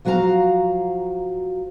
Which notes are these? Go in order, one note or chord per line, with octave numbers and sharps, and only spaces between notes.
F3 F#3 F#4 B4 F5 A#5